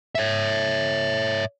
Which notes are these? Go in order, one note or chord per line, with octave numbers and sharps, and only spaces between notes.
C#5 E5